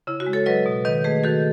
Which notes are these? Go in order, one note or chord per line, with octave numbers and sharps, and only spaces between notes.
C#3 E4
F#4
G#3
A4 C#5
F#3 B4 D#5
B2
D#3 B4 D#5
A3 G#4 B4
D#3 F#4 A4